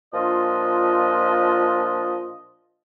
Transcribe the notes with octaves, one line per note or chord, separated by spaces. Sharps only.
A#2 F3 D4 F4 D#5